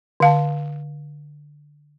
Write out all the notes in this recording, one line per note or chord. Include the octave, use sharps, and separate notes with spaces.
D3 F5 A5